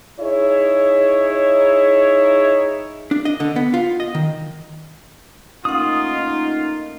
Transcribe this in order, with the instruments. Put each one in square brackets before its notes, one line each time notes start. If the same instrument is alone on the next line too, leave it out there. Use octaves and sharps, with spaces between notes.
[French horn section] D#4 E4 G#4 C#5
[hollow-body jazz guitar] D4
D#5
D3
B3
F4
D#5
D#3
[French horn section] A3 A#3 D#4 [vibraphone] C#4 F#5 [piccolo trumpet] F4 [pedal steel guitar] D#6